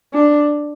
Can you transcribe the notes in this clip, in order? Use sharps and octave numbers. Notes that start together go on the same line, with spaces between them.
D4